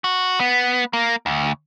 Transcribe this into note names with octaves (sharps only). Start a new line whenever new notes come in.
F#4
B3
A#3
D2